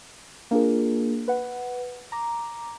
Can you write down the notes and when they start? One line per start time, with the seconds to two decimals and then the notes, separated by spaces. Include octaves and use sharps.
0.51 A#3 D4 F4 G#4 A#4
1.28 B4 F#5
2.12 A#5 D6